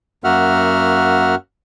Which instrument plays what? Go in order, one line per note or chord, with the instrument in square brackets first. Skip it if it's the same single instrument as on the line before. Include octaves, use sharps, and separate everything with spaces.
[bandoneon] F#2 A#3 F#4 E5 F#5 F6